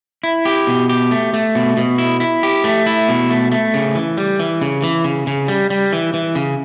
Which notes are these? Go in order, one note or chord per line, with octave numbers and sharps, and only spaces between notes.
E4
G4
B2
G4
A3
A3
B2
B2
E4
E4
G4
A3
E4
B2
A3
A3
C#3
E3
G3
E3
C#3
E3
C#3
C#3
G3
G3
E3
E3
C#3